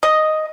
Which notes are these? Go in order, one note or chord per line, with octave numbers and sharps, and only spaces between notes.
D#5